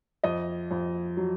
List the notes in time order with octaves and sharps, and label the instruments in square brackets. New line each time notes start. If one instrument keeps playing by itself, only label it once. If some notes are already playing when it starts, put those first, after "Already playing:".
[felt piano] F2 D#5
F2
F#3